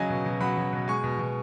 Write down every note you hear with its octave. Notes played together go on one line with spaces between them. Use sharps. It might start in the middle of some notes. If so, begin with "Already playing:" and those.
Already playing: C#3 F#3 D#5 G#5
B2
B2
F#3 F#5 B5
F#3
B2
G#3 G#5 C#6
B2
B2